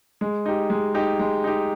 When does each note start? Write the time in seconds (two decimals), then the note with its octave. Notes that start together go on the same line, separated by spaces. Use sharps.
0.21 G#3
0.45 D#4 G4
0.70 G#3
0.94 D#4 G4
1.19 G#3
1.44 D#4 G4